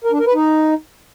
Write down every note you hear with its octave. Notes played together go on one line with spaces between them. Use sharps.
A#4
D4
A#4
B4
D#4